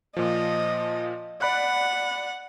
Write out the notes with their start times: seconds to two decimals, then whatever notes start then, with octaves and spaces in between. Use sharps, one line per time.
0.17 A#2 F3 D#5
1.42 D5 F#5 B5 F#6